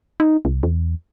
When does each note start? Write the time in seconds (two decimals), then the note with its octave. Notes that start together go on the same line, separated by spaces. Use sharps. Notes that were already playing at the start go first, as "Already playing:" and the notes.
0.20 D#4
0.45 C2
0.63 E2